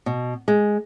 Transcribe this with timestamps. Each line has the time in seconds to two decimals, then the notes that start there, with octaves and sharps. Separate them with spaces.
0.06 B2
0.48 G#3